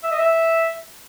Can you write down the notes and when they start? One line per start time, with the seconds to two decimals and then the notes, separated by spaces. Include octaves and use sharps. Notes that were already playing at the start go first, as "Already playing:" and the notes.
0.03 E5
0.11 D#5
0.19 E5